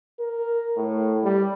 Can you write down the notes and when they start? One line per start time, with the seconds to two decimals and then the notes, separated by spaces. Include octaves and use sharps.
0.20 A#4
0.77 A2
1.24 G3